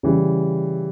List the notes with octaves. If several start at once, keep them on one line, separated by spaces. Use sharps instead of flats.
C#3 E3 G3